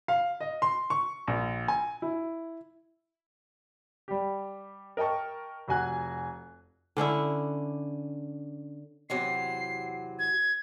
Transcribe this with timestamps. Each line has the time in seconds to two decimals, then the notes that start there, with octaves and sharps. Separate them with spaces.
0.08 F5
0.40 D#5
0.62 C6
0.90 C#6
1.28 A#1
1.68 G#5
2.02 E4
4.08 G3 G4
4.97 A#4 D#5 G5 A5 C#6
5.68 F1 F#4 G#5 F#6
6.97 D3 C#4 D4 E4
9.10 E2 C3 F#3 C7
10.19 G#6